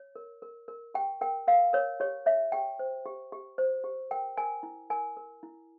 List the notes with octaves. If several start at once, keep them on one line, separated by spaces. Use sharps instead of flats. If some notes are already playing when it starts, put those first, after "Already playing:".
Already playing: C#5
A#4
A#4
A#4
G4 G5
A#4 G5
A#4 F5
A#4 C#5
G4 C#5
C#5 E5
G4 G5
C5
G4
G4
C5
G4
A#4 G5
A#4 G#5
E4
A#4 G#5
A#4
E4